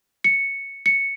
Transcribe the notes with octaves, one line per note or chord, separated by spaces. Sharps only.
C#7
C#7